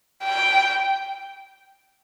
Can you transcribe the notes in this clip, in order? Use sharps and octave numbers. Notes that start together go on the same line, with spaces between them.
G5